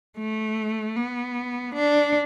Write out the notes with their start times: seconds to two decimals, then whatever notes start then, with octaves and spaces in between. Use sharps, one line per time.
0.18 A3
0.96 B3
1.75 D4